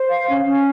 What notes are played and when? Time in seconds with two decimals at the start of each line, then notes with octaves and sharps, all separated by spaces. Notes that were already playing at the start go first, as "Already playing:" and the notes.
Already playing: C5
0.09 F5
0.28 C#4
0.46 C#4